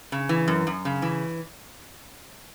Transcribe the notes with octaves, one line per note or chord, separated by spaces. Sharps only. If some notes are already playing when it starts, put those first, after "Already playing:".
C#3
E3
F#2
F#2
C#3
E3